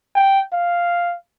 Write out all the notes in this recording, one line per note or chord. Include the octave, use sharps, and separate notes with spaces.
G5
F5